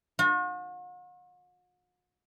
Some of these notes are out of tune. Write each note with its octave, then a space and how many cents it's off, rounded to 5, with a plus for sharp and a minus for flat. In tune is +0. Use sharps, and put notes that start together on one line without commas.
F#4 -45